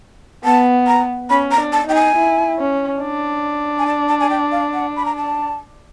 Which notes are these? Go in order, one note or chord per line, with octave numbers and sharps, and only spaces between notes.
B3 A5
A#5
C#4 B5
A#5
D4
A5
D#4 G5
G#5
E4
C#4
D4
G#5
A5
A5
G#5
G5
F5
F#5
B5
A#5
A5